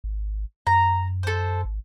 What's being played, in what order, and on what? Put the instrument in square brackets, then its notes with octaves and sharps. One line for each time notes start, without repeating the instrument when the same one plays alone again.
[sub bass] G#1
[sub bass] F#2 [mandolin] A#5
[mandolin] A4 C5
[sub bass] G#1